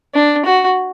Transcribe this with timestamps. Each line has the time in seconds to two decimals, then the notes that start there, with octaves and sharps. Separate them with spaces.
0.14 D4
0.45 F#4